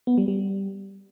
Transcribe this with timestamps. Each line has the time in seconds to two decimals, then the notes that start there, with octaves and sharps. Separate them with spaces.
0.07 B3
0.18 G3
0.28 G3